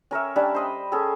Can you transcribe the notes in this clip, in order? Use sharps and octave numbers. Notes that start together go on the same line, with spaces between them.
C#4 A#4 C#5 E5
G3 C#4 D4
C5 D#5 B5
C#4 G#4 A4